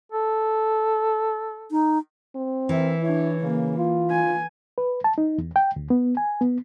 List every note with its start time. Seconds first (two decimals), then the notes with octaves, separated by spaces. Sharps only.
0.12 A4
1.71 D#4
2.35 C4
2.69 E3 A#4 E5
3.03 D4 E4 C#5
3.41 C#3 A#3
3.78 F4
4.11 G#5
4.78 B4
5.04 A5
5.18 D#4
5.38 E2
5.56 G5
5.76 D2
5.90 B3
6.17 G#5
6.41 B3